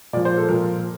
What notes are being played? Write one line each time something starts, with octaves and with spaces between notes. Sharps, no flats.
A#2 F3 D5
C5
A4
A#2 F3 A#4